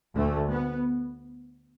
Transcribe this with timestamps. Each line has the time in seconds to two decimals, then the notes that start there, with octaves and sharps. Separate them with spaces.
0.14 D2 A3
0.50 B3